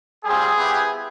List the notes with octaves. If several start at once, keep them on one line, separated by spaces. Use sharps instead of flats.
G3 C4 F4 G#4
B3 E4 G4